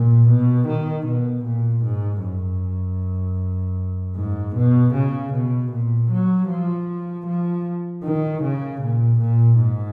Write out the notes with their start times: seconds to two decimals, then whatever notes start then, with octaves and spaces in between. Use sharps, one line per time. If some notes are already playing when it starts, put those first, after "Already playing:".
Already playing: A#2
0.29 B2
0.68 D#3
1.07 B2
1.45 A#2
1.84 G#2
2.23 F#2
4.16 G#2
4.55 B2
4.94 C#3
5.33 B2
5.72 A#2
6.11 F#3
6.49 F3
7.26 F3
8.04 D#3
8.43 C#3
8.81 A#2
9.20 A#2
9.59 G#2